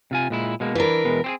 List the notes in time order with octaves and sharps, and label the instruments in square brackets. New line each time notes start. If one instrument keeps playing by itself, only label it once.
[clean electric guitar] C3 F4 G#5
A#2 G#3 E4
B2 G#3 A#3
[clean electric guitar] E3 D4 [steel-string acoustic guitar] A#4 B4
[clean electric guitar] E2 B2 G#3
C4 G4 G#4